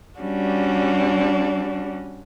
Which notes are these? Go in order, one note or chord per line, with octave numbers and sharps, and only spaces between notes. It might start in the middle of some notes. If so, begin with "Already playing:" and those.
G3 C#4 D4 F#4